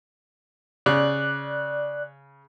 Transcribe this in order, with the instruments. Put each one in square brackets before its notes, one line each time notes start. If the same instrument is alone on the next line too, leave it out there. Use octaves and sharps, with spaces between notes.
[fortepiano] C#3 [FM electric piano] D5 F#6